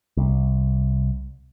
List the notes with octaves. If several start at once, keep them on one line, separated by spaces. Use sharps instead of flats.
C2